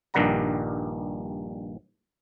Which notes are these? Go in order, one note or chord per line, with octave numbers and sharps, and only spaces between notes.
A#1 G2 D#3 G3 F#5 A#5